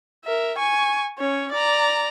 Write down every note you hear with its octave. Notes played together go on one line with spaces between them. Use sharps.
A#4 E5
G#5 C#6
C#4 C#5
D5 A#5